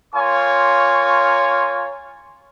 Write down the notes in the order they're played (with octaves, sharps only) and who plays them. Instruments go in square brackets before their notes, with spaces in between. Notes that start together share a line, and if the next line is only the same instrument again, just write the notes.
[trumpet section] A#3 F4 C#5 G#5 C6 C#6